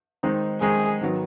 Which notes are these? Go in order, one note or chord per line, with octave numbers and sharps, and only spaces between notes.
D#3 G#3 C4 D#4
D#3 G#3 C4 D#4 G#4
G#2 D#3 F#3 B3